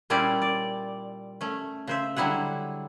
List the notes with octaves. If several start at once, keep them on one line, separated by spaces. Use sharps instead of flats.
A#2 G3 C#4 E4 C5 D5
D5
A3 C#4
C#3 C5 E5
D3 F#3 G3 E4 G#4 F#5